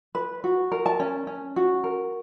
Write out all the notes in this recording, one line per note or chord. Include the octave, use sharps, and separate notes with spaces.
B4
F#4
A#4
A5
C#4
C#4
F#4
A#4